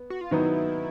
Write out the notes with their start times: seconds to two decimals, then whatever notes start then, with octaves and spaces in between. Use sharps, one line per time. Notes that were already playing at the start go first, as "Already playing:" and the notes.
Already playing: B3
0.10 F#4
0.21 F4
0.31 D#3 F#3 B3 D#4 E4